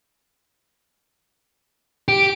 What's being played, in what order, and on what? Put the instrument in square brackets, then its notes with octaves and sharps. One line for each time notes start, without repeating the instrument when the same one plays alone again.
[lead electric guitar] G4 [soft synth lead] D7